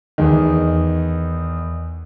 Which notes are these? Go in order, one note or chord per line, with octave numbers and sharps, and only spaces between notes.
E2 D#3